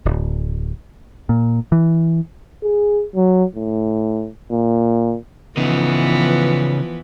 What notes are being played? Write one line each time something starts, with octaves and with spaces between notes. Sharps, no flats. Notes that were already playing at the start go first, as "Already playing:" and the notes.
D1
A#2
E3
G#4
F#3
A2
A#2
C#3 E3 F3 B3 D#4